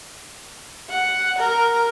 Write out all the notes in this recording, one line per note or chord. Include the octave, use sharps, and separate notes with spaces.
F#5
A#4